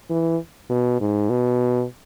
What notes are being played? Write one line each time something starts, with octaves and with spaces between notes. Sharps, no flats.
E3
B2
G#2
B2